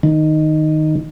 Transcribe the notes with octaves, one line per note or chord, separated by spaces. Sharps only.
D#3